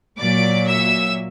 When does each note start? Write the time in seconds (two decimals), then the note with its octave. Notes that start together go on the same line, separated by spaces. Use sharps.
0.18 A#2 F#3 D5 D6
0.67 E5 E6